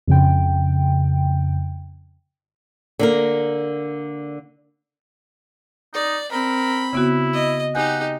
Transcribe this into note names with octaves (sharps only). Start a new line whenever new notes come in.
F2 C#3 G5
D3 A#3 A#4
D#4 D5
C4 A#4 B5
C#3 B3 E4 F#4
D#5
D#4 G4 F#5 G#5 G6